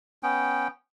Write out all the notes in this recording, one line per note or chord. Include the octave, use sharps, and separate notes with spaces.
B3 C#4 G5